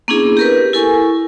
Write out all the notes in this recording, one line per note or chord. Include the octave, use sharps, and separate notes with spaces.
A#3 B3 C#4 D4 E4 G#4
G4 A#4 B4
E4 A4 A#4 G#5 C#6